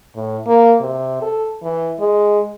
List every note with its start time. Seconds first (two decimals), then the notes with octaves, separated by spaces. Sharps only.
0.16 A2
0.47 A#3
0.81 C3
1.22 A4
1.63 E3
2.00 G#3